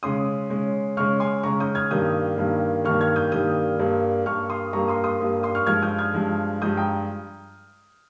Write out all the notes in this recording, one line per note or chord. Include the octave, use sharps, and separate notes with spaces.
C#3 G#3 C#4 C6 D#6
C#3 G#3 C#4
C#3 G#3 C#4 C#6 F6
G#5 C6
C#3 G#3 C#4 A#5 C#6
D#6 G6
F6 G#6
G2 D#3 G3 A#3 D#6 G6
G2 D#3 G3 A#3
G2 D#3 G3 A#3 C#6 F6
F6 G#6
D#6 G6
G2 D#3 G3 A#3 D#6 G6
G2 G3 A#3
G2 G3 A#3 C#6 F6
C6 D#6
G2 G3 A#3 A#5 C#6
C6 D#6
C6 D#6
G2 G3 A#3
C6 D#6
C#6 F6
G2 F3 G#3 F6 G#6
D#6 G6
F6 G#6
G2 F3 G#3
G2 F3 G#3 D#6 G6
G5 A#5